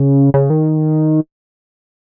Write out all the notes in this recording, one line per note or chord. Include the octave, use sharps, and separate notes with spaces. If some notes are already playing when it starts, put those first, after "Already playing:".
Already playing: C#3
C#3
D#3